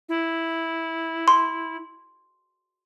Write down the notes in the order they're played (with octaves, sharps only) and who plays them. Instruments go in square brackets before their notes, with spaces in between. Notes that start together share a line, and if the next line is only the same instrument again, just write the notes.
[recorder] E4
[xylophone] C6